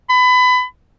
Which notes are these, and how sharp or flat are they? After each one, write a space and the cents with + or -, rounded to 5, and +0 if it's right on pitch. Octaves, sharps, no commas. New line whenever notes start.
B5 +25